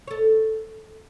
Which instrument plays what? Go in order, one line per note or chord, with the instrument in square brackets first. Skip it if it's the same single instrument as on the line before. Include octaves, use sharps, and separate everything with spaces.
[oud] A4 C#5